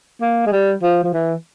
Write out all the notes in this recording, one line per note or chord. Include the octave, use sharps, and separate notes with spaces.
A#3
G#3
G3
F3
F3
E3